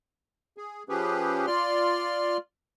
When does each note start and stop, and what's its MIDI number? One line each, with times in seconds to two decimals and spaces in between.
0.57 0.83 68
0.89 1.46 53
0.89 1.46 61
0.89 1.46 67
0.89 1.46 68
0.89 1.46 71
1.47 2.37 65
1.47 2.37 74
1.47 2.37 84
1.47 2.37 89